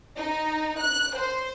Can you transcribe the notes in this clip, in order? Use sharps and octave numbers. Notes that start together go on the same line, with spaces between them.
D#4
F#6
C5